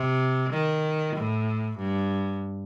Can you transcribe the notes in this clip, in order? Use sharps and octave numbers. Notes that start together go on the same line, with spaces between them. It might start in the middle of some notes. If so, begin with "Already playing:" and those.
Already playing: C3
D#3
A2
G2